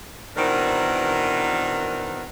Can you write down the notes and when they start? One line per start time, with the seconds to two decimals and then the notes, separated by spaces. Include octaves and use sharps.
0.37 B2 D#3 E3 C4 D4 A#4